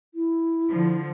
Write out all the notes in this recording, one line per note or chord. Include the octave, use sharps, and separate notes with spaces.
E4
D3 F3